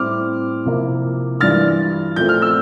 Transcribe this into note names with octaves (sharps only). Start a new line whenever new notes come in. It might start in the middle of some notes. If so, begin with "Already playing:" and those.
Already playing: A2 G3 C4 E4 D6 F6
C3 F3 A#3 E4
G2 E3 G3 D4 F4 F6 A6
A#2 F3 A3 C4 G6
F6
E6 G6